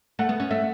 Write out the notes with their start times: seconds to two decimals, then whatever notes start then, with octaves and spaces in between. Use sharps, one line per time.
0.19 A3 F#5
0.29 B3
0.40 C#4
0.50 A3 E5